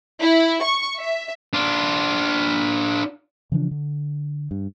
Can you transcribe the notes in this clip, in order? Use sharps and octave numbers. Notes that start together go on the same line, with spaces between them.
E4
C#6
E5
D4 F4
C#3 E3 F3 D4
D3
G2